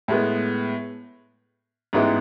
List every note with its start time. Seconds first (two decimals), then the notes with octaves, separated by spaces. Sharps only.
0.08 A2 G#3 B3
1.93 A1 G#2 G#3 B3 E4